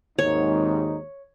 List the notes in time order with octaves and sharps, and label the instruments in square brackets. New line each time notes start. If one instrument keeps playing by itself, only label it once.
[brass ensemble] G#1 D#2 G#2 [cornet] D#4 [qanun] C#5